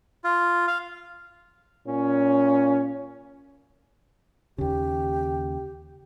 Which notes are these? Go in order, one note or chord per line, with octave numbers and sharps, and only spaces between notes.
F4
F5
A#2 C#4
D#2 C#3 G4